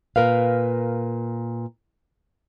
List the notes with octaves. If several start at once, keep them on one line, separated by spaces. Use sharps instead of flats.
A#2 A#4 B4 F5